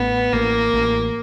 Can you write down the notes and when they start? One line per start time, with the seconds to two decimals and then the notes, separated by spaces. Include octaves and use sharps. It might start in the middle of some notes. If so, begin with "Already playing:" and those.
Already playing: A1 A2 B3
0.33 A1 A#3
0.74 A1